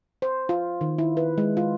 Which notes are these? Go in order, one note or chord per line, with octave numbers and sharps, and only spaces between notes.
C5
F4
D#3
E4
B4
G#3
F4